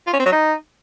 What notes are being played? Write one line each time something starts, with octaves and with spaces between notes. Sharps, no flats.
F4
C#4
C4
F#3
D#4